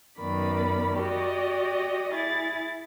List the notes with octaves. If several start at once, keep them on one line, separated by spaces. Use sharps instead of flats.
F#2 D#3 B3 D5 B5
F#4 G4 D5 D#5
E4 G#4 A6